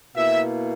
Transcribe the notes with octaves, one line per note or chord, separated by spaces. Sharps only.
B2 A#3 E4 E5